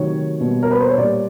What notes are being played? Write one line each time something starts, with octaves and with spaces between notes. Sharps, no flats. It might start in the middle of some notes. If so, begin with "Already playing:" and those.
Already playing: C3 D#3 F#3 A3 C#5
B2 G3 A#3
A#4
B4
C5
C#5
A#2 G3 A#3 D5